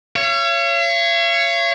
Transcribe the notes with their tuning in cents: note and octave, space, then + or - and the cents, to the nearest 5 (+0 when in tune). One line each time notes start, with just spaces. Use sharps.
C#5 +0 F5 -45